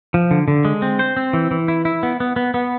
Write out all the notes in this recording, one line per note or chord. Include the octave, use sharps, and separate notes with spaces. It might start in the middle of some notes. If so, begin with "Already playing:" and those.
F3
D3
D3
G#3
C4
C5
C4
E3
E3
E4
E4
B3
B3
B3
B3